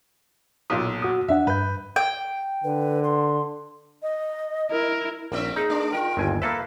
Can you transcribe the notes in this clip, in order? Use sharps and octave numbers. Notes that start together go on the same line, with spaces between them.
B1 A#2 D#6
F#4 D#6
E2 D4 E5 F#5
G2 B4 G6
G5
D3 B4
C6
D#5
E4 A#4
A#1 A#3 C4 E5
D#4 G#4
A3 D4
F4 A#4 G5
G1 D#2 G#5
A#3 A4 B4 E5 F5